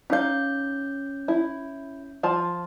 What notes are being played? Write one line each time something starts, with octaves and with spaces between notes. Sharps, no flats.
C#4 D#4 F5 G6
E4
F3 F4 A5